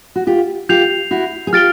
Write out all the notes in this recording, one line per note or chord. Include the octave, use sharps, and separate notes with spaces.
F#4
F4 G4
F4 G4 G6 C7 F7
E4 F#4
G#4
F4 G4 F6 A6 D7 G7